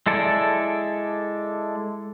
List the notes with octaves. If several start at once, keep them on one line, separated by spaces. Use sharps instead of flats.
G#3 E4 A4 D5